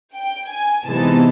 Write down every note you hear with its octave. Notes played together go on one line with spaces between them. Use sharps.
G5
G#5
C3 E3 G#3 B3 D#4 A5